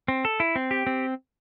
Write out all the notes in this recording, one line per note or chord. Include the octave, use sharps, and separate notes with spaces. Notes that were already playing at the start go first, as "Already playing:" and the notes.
C4
A4
E4
C4
G4
C4